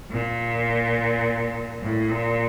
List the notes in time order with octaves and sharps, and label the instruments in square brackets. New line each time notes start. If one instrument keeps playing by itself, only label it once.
[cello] A#2
A2
A#2